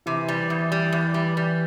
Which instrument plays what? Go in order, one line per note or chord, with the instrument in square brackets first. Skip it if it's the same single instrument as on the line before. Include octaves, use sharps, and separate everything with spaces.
[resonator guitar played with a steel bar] C3 [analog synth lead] E3
[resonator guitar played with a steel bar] G3
E2
G3
E2
G3
G3